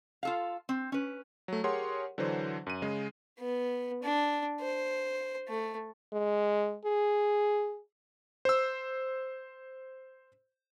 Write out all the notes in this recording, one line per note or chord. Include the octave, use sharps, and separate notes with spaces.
F4 A4 F5
C4
C#4 B4
F#3 A3
G4 G#4 A#4 C#5 F#5 C6
D3 E3 F#3 D4 C5
F#2 D#7
C#3 G#3
B3
D4
C5
A3
G#3
G#4
C5 E6